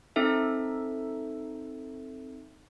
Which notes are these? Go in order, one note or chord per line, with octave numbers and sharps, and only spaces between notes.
C4 D#4 A4 E5